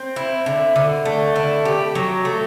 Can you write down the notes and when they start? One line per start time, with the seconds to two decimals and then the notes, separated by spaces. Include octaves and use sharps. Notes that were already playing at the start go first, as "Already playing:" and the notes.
Already playing: C4
0.16 E4
0.46 D3
0.76 D3
1.05 A3
1.36 E4
1.65 G4
1.95 F#3
2.25 A3